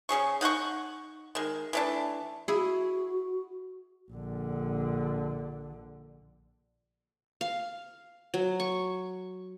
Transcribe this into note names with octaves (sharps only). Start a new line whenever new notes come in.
C#3 C#4 G#4 C#6
D#4 F#5 G5 C#6
D#3 G#3
E3 A3 D4
E4 F#4 G#4
A#1 D3
F5
F#3
C#6